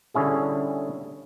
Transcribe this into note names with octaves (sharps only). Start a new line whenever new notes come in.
D3 G3 C#4 E4 G#4